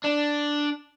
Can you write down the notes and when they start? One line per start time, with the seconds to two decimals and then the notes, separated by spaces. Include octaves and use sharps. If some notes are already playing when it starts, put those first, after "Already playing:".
0.04 D4